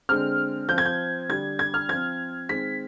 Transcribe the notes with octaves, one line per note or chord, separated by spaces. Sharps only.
D3 G#3 C4 F6
F3 C4 G6 G#6
G6
D3 G3 D4 G#6
G#6
F6
F3 C4 G#6
D#3 G#3 C4 B6